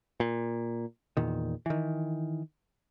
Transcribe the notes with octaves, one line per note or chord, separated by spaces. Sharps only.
A#2
E2 A#2 D#3
D#3 E3